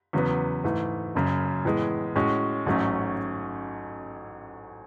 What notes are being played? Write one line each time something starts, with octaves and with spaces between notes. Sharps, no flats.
E2 C#3 F#3 B3
G#2 E3 A3
F#1 F#2 C#3
A2 E3 G#3 B3
A2 G#3 C#4 F#4
A1 G#2 F#3 A3 C#4